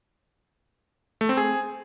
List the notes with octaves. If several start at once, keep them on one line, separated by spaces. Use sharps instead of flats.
A3
C4
G#4